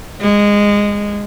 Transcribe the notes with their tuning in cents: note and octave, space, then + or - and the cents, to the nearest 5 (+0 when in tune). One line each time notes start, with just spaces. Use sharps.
G#3 -15